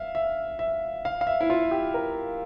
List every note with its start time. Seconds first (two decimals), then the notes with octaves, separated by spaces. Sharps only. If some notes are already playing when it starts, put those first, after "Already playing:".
Already playing: E5 F5
0.15 E5
0.59 E5
1.05 F5
1.21 F5
1.27 E5
1.41 E4
1.50 F4
1.71 G4
1.94 A#4